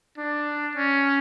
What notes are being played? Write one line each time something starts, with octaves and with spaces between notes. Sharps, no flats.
D4
C#4